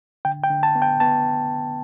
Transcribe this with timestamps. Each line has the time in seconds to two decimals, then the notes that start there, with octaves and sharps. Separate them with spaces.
0.25 D3 G5
0.44 G5
0.50 D3
0.63 A5
0.75 B3
0.82 G5
1.00 B3 A5